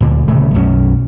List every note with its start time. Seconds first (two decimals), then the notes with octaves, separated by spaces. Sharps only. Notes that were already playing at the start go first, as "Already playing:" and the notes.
0.01 D2 A#2 D3
0.28 D#1 C#3 A3
0.54 B1 F#2 G3 C#4